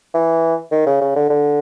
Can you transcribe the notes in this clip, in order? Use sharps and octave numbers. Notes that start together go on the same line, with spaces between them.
E3
D#3
C#3
C#3
D3
D3